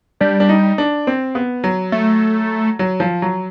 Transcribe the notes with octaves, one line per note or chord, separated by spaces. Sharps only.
G3 D4
D4
D#4
D4
C4
B3
F#3
A3
F#3
F3
F#3